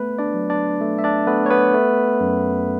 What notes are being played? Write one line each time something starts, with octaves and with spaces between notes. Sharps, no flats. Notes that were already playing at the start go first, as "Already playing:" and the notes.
Already playing: A3 B3 B4
D4 D5
F#3
D4 D5
A3
E5
D4 D5
A3 B3 B4
C#5
B3 B4
A3
F#2